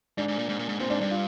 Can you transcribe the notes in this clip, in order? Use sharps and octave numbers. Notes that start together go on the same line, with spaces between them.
G#2 D4
G#2
A#2
G#2
A#2
G#2
A#2 C4
G#2 D4
G2 D4
F4